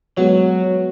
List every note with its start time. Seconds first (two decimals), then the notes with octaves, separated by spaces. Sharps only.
0.17 F#3 G#3 B3 F#4 C#5